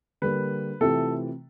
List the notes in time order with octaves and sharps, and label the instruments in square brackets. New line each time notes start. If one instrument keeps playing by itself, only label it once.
[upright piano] D3 G3 A#3 [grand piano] B4
[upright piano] C3 E3 A3 C4 F4 [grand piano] A4